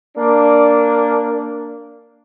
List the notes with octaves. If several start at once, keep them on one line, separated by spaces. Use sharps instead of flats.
A#3 D4